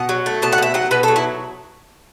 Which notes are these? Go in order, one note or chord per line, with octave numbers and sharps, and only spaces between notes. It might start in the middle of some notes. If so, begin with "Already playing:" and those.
Already playing: B2 F#5
F#3
A3
B2 A5
F#5
B2 E5
F#3 F#5
B2 B4
A4
F#3
E4